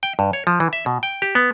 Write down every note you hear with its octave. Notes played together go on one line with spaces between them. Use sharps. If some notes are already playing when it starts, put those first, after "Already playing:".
G5
G2
C#5
F3
E3
E5
B2
G5
G4
B3